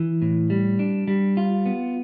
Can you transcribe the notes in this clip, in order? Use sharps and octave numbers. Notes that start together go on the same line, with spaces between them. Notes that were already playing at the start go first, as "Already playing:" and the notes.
Already playing: E3
A2
G3
D4
G3
F4
B3